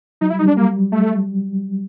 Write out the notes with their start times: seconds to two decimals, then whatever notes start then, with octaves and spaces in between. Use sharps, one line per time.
0.21 F#3 D#4
0.30 G3 E4
0.39 D#4
0.45 G3 D4
0.57 G3 A#3
0.92 A3